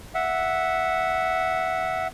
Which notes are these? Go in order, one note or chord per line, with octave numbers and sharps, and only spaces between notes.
E5 F#5